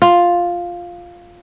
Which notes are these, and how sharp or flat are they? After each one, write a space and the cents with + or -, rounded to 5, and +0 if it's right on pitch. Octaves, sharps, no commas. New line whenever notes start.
F4 +5